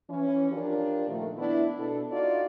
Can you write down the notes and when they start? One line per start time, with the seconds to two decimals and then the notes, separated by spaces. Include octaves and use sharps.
0.10 E3 C#4
0.51 F3 D4 F4 G4 A#4
1.08 A#2 D#3 F3 A3
1.37 B3 D4 E4
1.79 B2 D4 A4
2.11 D#4 F4 F#4 D5